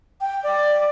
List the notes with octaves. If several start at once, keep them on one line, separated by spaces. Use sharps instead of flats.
G5
D5